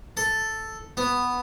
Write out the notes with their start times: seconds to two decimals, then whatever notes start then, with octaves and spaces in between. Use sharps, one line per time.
0.17 A4
0.97 B3